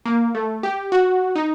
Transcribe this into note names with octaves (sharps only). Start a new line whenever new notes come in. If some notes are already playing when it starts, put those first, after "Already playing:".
A#3
A3
G4
F#4
D#4